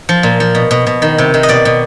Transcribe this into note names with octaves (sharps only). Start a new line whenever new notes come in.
F3
A#2
F3
B2
B2
B2
D#3
C3
D#3
D#5
B2 D5
B2